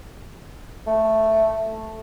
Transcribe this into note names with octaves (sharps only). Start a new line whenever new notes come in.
A3